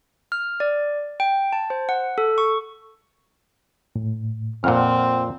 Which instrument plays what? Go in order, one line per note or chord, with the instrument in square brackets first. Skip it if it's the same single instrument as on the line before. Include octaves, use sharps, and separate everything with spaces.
[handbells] F6
D5
G5
A5
C5
F#5
A4
C#6
[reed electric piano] A2
[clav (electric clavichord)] F2 A#2 [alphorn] C4 [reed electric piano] F#5 F6